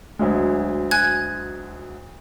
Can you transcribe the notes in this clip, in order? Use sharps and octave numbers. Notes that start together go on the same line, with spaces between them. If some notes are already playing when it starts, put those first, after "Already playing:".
D2 F#3 G#3
G#5 F#6 G#6